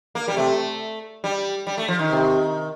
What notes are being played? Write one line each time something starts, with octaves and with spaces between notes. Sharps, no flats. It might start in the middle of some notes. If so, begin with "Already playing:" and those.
A#3
G3
C3 A3
G3
G3
A3
F3
D#3
C3